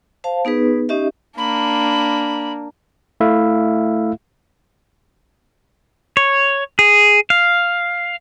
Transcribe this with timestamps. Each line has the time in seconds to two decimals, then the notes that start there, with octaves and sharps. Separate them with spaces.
0.24 C5 F5 A5
0.45 B3 D#4 G#4 B4
0.89 C#4 D#4 G4 D#5 E5
1.37 A#3 D4 B5
3.20 A3 E4 E5 F5
6.17 C#5
6.79 G#4
7.30 F5